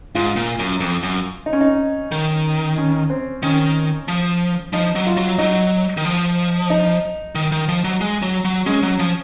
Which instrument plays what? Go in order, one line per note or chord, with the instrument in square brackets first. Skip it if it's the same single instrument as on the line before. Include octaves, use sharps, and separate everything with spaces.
[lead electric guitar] G#2 [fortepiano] F4
[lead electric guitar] A#2
F#2
F2
F#2
[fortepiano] D#4
C#4
D#4
[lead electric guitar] D#3
[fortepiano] C#4
C4
[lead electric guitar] D#3 [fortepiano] C#4
[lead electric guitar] F3
[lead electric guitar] F3 [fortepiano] D#4
[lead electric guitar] F#3
[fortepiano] F4
[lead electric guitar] F#3
[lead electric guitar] F#3 [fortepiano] D#4
[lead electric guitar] D#3
F3
[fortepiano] D#4
[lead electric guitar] D#3
D#3
F3
F#3
G#3
F#3
F#3
[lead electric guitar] G#3 [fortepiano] C#4
[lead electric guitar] F#3
F3